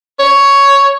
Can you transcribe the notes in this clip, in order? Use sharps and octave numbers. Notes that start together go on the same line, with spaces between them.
C#5